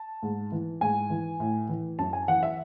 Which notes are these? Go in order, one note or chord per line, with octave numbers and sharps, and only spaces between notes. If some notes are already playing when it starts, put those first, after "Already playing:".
Already playing: A5
G#2
E3
G#2 G#5
E3
A2
E3
F#2 A5
G#5
E3 F#5
E5